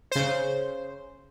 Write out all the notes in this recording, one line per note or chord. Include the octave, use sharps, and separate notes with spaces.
C#3 C5